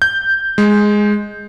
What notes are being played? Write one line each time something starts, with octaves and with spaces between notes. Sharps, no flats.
G6
G#3